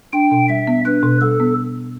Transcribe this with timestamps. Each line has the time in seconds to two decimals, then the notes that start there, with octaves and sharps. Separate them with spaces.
0.13 D4 G5
0.32 B2
0.49 G3 E5
0.67 B3
0.85 D4 B4
1.03 B2
1.21 G3 A4
1.40 B3